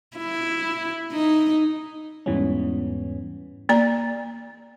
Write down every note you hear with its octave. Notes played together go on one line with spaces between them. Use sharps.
E4
D#4
E2 G#2 E3 G3 B3 C#4
A#3 D5 A#5